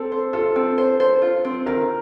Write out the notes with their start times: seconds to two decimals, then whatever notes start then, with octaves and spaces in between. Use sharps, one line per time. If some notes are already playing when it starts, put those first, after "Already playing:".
Already playing: C4 A4
0.12 C5
0.33 F4 A4
0.56 C4
0.78 C5
1.00 C5
1.22 F4
1.45 C4
1.66 D#3 A#4